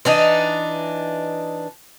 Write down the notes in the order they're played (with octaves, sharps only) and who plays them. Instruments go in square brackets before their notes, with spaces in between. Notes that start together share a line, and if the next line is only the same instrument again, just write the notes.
[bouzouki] E3 D4 D#4